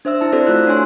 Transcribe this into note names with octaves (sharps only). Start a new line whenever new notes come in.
D4 C5 E5 E6
E4 A5
C4 E4 F#4 A4 C5 D5
A3 F4 E6 F#6
D4 F#4 C#5 G#5 C6